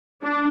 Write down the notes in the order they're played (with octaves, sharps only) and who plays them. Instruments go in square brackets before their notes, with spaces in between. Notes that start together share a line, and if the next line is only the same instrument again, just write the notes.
[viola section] D4